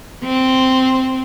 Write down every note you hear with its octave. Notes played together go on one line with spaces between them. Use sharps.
C4